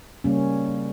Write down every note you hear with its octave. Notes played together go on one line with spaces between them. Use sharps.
C#3 G3 A#3 C#4